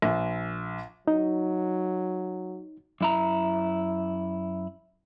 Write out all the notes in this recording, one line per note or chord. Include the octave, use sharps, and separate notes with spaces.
A#1
F#3 D#4
F#2 E4 A#5